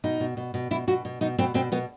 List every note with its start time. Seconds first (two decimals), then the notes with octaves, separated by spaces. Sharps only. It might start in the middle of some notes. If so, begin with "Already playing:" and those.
0.04 B2 D#4
0.20 B2
0.37 B2
0.54 B2
0.71 B2 E4
0.87 B2 F#4
1.05 B2
1.21 B2 D#4
1.38 B2 C4
1.54 B2 C4
1.72 B2 B3